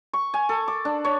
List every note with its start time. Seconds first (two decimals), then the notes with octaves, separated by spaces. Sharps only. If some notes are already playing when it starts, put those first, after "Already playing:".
0.13 C#6
0.34 G#5
0.49 A4
0.68 D6
0.85 D4
1.04 C#5